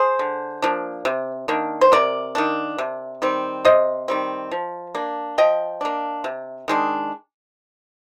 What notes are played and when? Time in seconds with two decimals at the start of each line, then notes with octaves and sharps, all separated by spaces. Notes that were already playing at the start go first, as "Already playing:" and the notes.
Already playing: G#4 C5
0.19 D3
0.62 F3 A#3 D4
1.05 C3
1.48 D#3 A#3 D4
1.81 C5
1.92 C3 A#4 D5
2.35 D#3 A#3 D4
2.78 C3
3.22 D#3 G3 C4
3.65 C3 C5 D#5
4.08 D#3 G3 C4
4.52 F3
4.95 A#3 D4
5.38 F3 D#5 G5
5.81 A#3 D4
6.24 C3
6.68 D#3 G#3 D4